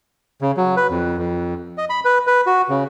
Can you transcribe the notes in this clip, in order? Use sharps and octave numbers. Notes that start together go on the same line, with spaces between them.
C#3
F#3
B4
F2
F2
D#5
B5
B4
B4
F#4
C#3